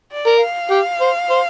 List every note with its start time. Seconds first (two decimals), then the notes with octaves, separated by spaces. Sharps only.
0.12 D5
0.26 A#4
0.41 F5
0.70 G4
1.01 C5
1.30 C5